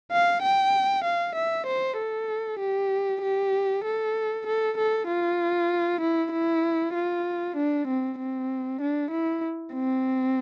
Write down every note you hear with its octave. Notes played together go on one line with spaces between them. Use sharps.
F5
G5
F5
E5
C5
A4
G4
G4
A4
A4
A4
F4
E4
E4
F4
D4
C4
C4
D4
E4
C4